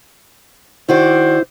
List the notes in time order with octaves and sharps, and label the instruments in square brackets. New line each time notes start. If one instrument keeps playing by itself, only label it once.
[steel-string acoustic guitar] D#3 F#4 D5 [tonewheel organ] E4 [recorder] C5